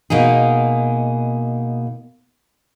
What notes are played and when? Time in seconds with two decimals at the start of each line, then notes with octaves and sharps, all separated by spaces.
0.10 B2 A#3 D#4 G#4